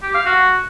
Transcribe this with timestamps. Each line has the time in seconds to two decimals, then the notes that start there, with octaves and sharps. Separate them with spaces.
0.03 G4
0.14 F5
0.26 F#4